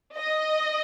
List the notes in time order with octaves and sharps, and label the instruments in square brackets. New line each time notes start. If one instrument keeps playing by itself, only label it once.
[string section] D#5